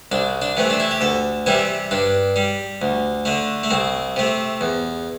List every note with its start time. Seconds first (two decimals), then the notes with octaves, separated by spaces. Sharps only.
0.12 C2 D4
0.42 D4
0.57 C3 E3 A3
0.70 D4
0.80 E4
0.91 G4
1.01 D2 A4
1.46 C3 E3 G3 E4
1.91 G2 D4
2.36 G3
2.82 D2
3.25 D3 A3
3.64 A3
3.71 C2 C4
4.16 C3 A3
4.61 E2